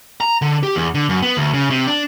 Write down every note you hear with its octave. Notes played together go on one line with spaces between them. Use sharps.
A#5
D3
G4
E2
D3
F#2
B3
D2
C#3
C3
D4